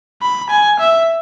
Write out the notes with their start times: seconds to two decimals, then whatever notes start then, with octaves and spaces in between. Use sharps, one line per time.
0.22 B5
0.50 G#5
0.79 E5